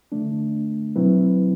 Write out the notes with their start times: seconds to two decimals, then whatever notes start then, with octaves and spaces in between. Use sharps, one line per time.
0.12 D3 A3 D4
0.96 B2 F#3 C4 E4 B4